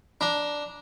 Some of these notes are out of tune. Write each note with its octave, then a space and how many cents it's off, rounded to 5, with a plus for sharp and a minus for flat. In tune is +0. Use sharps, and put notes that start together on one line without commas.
D4 +0 A#5 +15